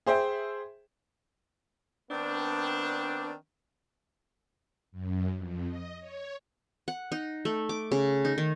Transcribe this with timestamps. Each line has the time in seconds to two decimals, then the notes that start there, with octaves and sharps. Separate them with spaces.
0.06 G#4 C5 E5 G5
2.11 D#3 B3 C4 D4
4.92 F#2
5.35 F2
5.67 D#5
6.00 C#5
6.88 F#5
7.12 D#4
7.45 A3
7.69 D6
7.92 C#3
8.25 D#4
8.38 D#3